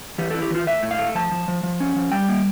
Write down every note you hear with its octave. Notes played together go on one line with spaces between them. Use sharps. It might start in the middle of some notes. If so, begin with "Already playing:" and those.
E3 G4
A4
E4
G4
E3 F4
A3 E5
A2
F5
A3
F3 A5
F3
F3
F3
C#4
F3
G3 G5
A#3